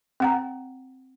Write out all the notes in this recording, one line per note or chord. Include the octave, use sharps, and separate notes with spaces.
C4 F#5 A#5